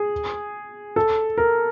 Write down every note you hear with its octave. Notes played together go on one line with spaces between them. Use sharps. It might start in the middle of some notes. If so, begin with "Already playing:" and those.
Already playing: G#4
A4
A#4